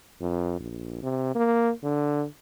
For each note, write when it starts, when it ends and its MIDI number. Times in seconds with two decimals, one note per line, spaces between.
0.21 0.58 41
0.60 1.01 34
1.03 1.32 48
1.35 1.70 58
1.83 2.25 50